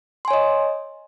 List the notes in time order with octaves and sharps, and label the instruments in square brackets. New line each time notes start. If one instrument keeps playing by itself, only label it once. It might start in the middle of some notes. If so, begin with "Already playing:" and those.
[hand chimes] C6
G#5
C#5
D#5